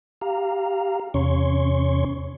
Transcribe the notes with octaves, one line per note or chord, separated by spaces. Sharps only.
G4 F5 A#5
E2 C3 C#4 C#5 C6 C#6